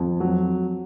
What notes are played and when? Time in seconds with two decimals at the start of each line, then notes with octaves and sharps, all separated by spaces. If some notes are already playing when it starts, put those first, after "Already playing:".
Already playing: F2
0.20 F#3